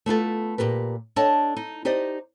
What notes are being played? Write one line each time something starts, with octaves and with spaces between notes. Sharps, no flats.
A3 B3 F4 A4
A#2 C#3 G4 A#4 B4
D4 A4 C#5 D#5 G5 A5
D#4
D#4 G4 C5 D5 D#5